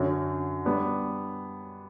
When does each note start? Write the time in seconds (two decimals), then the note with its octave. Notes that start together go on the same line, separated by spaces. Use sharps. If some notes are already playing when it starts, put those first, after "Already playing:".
Already playing: F#2 D3 F#3
0.65 G3 B3 D4